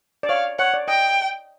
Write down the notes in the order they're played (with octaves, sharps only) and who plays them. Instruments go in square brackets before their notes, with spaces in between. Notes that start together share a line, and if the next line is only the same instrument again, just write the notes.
[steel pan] D5
[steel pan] C#5 [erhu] F5
[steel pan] C#5 [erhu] F#5
[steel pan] D5
[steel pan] D#5 [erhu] G5